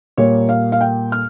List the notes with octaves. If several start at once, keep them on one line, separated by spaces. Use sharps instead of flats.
A#2 G3 A#3 C#5
F5
F5
G5
F6